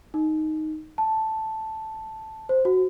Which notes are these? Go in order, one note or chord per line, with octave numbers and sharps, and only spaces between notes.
D#4
A5
C5
F#4